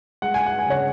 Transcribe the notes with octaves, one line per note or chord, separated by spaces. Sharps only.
G#3 F#5
G#5
F#5
G#5
C#3 C#5 F#5